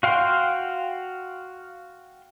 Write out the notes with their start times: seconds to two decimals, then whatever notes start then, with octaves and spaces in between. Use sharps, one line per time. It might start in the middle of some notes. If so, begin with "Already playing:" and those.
0.03 F#4 F5 G5 C6